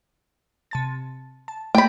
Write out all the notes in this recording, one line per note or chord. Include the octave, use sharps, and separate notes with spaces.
C3 A5 A6
A5
A3 A#3 G5 B5